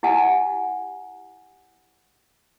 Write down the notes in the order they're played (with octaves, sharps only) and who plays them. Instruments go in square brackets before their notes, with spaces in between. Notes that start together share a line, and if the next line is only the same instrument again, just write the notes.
[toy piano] E4 G4 F#5 G#5